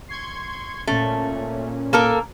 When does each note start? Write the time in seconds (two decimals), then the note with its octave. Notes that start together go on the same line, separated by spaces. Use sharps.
0.08 C6 C#6 G#6
0.87 A#2 A3 C#4
1.93 A#3 A4 A#4